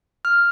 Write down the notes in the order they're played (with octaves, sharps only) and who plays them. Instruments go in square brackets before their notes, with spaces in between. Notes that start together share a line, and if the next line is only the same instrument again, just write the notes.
[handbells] F6